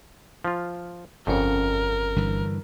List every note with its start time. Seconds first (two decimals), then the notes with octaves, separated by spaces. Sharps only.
0.44 F3 F4
1.27 G1 F2 C#3 C#4 A#4
2.16 G2 D3 E3